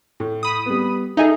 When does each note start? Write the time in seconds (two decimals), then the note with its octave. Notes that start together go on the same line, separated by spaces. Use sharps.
0.20 A2
0.43 B5 D#6
0.66 G3 B3
1.17 D#4 G#4 A4 D#5 E5